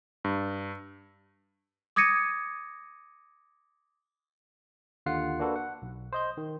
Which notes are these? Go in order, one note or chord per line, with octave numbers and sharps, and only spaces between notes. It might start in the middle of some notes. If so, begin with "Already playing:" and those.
G2
D6 D#6 G#6 A#6 C#7 D#7
D#2 D3 F4 F#5 C7 C#7
A#3 D4 F#4 A4 B4
F#5
B1
C5 D#5 G6
D#3